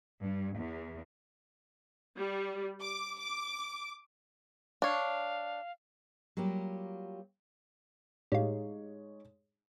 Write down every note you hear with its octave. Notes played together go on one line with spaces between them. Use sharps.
G2
E2
G3
D6
D6
D4 C#5 F5
F#3 G3 A#3 F4 G4
A2 G#3 D#4 G4 C#5 F5